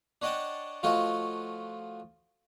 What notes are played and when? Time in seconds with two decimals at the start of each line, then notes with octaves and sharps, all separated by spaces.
0.22 D4 C#5 D#5 F#5 G5 A5
0.83 F3 A3 F4 F#4 C#5 D#5